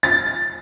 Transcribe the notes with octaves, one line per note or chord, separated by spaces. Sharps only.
A6